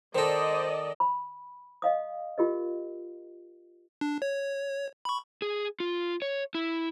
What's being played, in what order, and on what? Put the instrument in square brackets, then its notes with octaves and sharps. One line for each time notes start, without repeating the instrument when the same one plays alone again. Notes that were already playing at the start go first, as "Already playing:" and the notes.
[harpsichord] D#3 A4 [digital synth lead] C5 [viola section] D5 D#5
[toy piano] B5
D#5 F5 D#6
F4 G4 A#4 D#5
[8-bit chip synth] D4
C#5
B5 C#6
[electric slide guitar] G#4
F4
C#5
E4